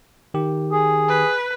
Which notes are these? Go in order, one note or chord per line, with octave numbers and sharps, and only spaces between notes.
D#3 G4
G#4
B4